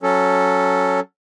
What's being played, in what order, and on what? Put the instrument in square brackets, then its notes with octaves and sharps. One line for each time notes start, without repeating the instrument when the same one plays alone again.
[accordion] F#3 C#4 A4